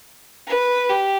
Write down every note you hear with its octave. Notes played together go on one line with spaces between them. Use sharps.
B4
G4